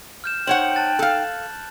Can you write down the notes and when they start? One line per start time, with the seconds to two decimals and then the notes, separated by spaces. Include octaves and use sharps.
0.24 F6 G6 E7
0.47 D#4 C5 C#5 F#5 G5 F#7
0.76 A5 F#6 A6
0.99 A4 F5